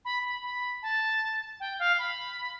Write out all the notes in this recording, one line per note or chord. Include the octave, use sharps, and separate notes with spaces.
B5
B5
B5
A5
G5
F5
B5